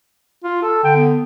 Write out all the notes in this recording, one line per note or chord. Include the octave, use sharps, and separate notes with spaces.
F4
A4
D3 G5
B3